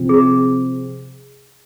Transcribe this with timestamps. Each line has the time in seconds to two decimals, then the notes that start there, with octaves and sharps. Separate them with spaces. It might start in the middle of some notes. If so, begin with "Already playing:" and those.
Already playing: C3 F3 C4 F4
0.09 G#4